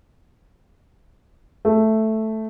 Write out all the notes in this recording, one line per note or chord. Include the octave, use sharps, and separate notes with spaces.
A3